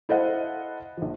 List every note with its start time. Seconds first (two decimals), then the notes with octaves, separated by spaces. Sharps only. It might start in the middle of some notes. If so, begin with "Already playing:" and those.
0.09 E4 A4 C5 D#5 F5 F#5
0.97 A#1 F3